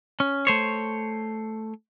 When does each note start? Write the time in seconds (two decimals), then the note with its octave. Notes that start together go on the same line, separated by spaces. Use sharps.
0.20 C#4
0.47 A3 C5 C#5